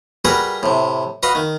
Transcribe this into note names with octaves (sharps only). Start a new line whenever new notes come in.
G3 F#4 G#4 A#4 B4
A2 C3
F#4 B4 D#5 F5
D#3